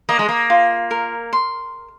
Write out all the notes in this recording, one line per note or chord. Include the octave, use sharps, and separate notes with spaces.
A#3 D#5
G#3
A#3
F4
A#4
C6